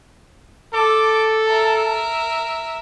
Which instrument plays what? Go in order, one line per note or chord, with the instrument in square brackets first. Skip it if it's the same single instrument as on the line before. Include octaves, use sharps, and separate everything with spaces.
[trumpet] A4 [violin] D6
[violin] A#4 E5